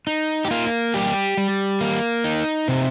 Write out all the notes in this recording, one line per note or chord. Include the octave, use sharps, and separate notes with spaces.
D#4
G4
A#3 F4
G3 G4
G3
A#3
D#4
C3